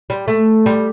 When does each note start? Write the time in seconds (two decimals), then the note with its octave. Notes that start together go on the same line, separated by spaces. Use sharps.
0.10 G3
0.28 A3
0.66 G3